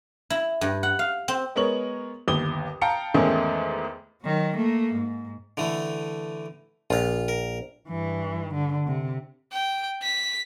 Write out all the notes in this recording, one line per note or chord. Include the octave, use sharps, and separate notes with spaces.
E4
G2
F#5
F5
C4
G#3 B3 A#4 C#5 C#6 F#7
G1 D#2 D#6 G7
F5 G5 A5 A#5 C#7
E2 G#2 D#3 G#3 A3 C#4
D#3 F#3
A3 A#3
G#2
D3 E3 A3
A#1 F4 F5
A#4
G2 E3
D3
C3
G5
B6